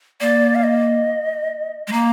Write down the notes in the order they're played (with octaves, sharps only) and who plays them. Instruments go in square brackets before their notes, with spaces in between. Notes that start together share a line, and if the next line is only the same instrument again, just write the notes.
[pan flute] A#3 [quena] D5
[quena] F5
D#5
[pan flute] G#3
[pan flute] A#3 [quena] A#5